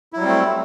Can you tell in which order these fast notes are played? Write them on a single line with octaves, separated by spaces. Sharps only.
E4 F#3 G3 C4 A3